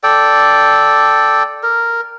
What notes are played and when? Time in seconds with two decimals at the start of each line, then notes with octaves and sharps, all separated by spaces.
0.03 A4 D5 G5
1.63 A#4